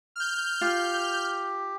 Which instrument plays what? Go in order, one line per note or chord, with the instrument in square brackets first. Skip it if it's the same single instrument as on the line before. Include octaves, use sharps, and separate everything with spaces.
[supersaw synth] F6 G6
[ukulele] F4 [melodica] G4